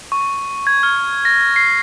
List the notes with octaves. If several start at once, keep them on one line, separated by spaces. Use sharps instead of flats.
C#6
G#6
F6
A#6
C7